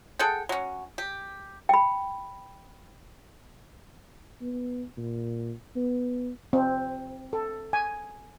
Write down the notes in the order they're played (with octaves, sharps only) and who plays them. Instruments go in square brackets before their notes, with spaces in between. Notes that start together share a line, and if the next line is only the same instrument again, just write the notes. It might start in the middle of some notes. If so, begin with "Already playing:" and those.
[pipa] G#4 A4 F#5 G5
F#3 C#4
G4
[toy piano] G5 B5
[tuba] B3
A#2
B3
[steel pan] C4
A4
G#5